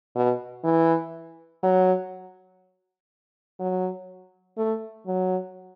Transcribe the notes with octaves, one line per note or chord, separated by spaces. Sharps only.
B2
E3
F#3
F#3
A3
F#3